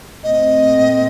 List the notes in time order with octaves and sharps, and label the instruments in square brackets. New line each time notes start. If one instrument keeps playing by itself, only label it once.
[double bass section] A#2 A3 C4 [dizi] D#5